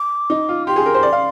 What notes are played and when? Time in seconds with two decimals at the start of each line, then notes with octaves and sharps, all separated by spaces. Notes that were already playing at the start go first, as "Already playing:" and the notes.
Already playing: D6
0.30 D#4
0.49 F4
0.67 G4 C6
0.76 G#4
0.86 A#4
0.94 C5
1.03 D5
1.13 F5